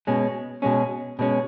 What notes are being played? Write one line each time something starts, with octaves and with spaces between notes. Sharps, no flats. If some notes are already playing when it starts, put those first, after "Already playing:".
B2 G#3 C#4
B2 G#3 C#4
B2 G#3 C#4